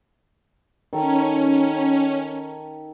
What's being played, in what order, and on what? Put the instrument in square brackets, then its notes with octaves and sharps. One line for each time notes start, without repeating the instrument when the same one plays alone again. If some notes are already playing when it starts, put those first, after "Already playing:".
[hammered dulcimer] D#3 A4 [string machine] C#4